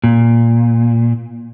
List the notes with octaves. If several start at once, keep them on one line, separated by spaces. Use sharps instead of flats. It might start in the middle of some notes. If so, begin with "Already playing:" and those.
A#2